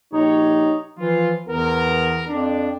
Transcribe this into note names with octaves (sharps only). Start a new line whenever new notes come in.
A#1 D#4 G4 C#5
E3 F3 F4
E2 E3 B3 A#4
F2 D4